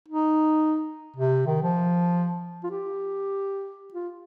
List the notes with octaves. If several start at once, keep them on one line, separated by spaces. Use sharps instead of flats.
D#4
C3
D#3
F3
F4
G4
F4